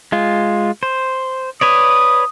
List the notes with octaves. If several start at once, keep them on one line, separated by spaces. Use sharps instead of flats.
G#3 F4
C5
B4 C#5 D5 D#6